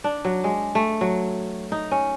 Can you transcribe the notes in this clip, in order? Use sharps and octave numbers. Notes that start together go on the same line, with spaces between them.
D4
F#3
G#3
A3
F#3
D#4
C#4